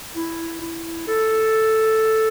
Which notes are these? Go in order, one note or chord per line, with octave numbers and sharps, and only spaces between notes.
E4
E4
A4